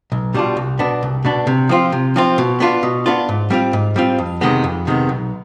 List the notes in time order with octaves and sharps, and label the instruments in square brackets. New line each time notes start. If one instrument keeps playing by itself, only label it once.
[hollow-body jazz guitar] B1
B2 G3 D4 F4
C2
B2 B3 D4
C2
B2 B3 D4
C3
F3 C4 F4
C3
F3 C4 F4
B2
B3 D4 F4
B2
B3 D4 F4
G#2
G3 C4 F4
G#2
G3 C4 F4
F2
C3 D#3 G#3 B3
F2
C3 D#3 G#3 B3
B1